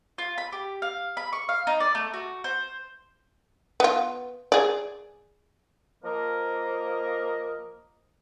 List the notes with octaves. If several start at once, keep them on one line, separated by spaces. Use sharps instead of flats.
F4
B5
G4
F5
B5
C#6
F5
D#4
D5
A3
F#4
C5
B3 F4
G#4 D5
F3 A#3 A#4 D#5